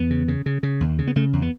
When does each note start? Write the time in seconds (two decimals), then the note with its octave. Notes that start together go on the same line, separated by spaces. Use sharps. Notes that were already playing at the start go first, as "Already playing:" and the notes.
Already playing: E2 B3
0.10 C#3
0.28 C#3
0.46 C#3
0.63 C#3
0.81 D#2
0.99 C#3
1.07 B3
1.16 C#3 A3
1.33 E2
1.42 B3